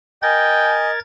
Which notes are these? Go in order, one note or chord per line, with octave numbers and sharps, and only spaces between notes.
A#4 D#5 G5 G#5 G#6 A6